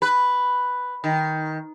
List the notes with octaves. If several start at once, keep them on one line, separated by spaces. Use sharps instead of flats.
B4
D#3